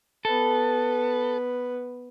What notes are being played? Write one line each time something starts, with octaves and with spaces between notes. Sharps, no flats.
B3 A4 B4